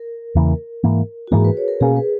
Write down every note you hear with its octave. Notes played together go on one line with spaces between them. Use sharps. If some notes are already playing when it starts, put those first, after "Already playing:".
Already playing: A#4
E2 C#3 E3 A#3
G#2 E3 A#3
F#4
G#2 E3 A#3 G#4
B4
C#5
A#4
B2 A#3 C#4 G#4
B4